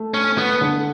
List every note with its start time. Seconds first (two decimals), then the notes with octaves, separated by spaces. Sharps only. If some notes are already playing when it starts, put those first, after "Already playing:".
Already playing: A3
0.14 C#4
0.38 B3
0.61 D3